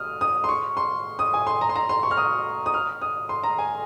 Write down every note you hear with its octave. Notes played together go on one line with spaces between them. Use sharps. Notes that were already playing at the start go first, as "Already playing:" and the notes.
Already playing: D#6 F6
D#6
C6
C#6
C6
D#6
G#5
C6
A#5
C6
A#5
C6
C#6
F6
D#6
D#6
F6
D#6
C6
A#5
G#5